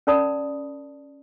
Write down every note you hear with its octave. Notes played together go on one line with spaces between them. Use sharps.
C#4 A#4 D5 A5 B5 D#6